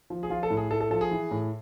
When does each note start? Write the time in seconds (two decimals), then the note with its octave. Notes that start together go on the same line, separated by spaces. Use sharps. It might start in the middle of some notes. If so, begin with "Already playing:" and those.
0.10 F3
0.23 G#4
0.30 F3 F4
0.43 A4
0.50 A2
0.57 G#4
0.70 A2 A4
0.81 A4
0.91 F3 A4
1.01 G#4
1.11 E3
1.31 A2